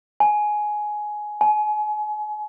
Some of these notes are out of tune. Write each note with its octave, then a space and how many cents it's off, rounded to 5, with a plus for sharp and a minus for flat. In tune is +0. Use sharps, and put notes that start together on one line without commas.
G#5 +15
G#5 +35